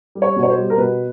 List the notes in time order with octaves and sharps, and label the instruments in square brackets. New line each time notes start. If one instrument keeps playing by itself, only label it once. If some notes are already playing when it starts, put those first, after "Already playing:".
[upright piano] G3
C#5
B2
C#5
C5
G3
A#4
B2 B4